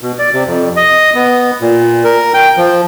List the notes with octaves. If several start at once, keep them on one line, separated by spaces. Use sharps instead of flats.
B2
D5
C3
F2
D#5
B3
A#2
A#4
G5
F3